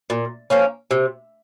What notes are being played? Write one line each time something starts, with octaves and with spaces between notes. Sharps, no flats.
A#2
F3 A#3 C#4
C3